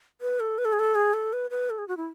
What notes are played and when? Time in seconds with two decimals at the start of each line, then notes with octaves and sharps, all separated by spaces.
0.21 B4
0.40 A4
0.58 B4
0.65 A4
0.73 G#4
0.79 A4
0.95 G#4
1.14 A4
1.33 B4
1.51 B4
1.70 A4
1.78 G#4
1.88 F#4
1.97 E4